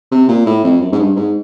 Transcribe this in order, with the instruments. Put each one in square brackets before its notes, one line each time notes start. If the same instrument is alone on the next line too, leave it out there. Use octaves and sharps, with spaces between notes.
[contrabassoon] C3
A#2
A2
F2
F#2
G#2
G2
G#2